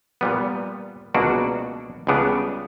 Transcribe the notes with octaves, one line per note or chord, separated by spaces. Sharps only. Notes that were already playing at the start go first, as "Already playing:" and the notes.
A#2 G3 B3
C#2 B2 A#3 D4 F#4
C#2 C#3 G3 B3 D4